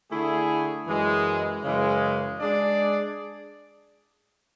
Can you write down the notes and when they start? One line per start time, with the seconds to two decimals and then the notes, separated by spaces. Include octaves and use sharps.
0.12 D3 A3 E4 G#4
0.87 F#2 E3 G#3
1.64 F#2 C#3 E3 G#3
2.40 G#3 D4 G#4 D5